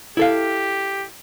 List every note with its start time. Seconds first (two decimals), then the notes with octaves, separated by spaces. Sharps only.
0.17 E4 G4 A4 F5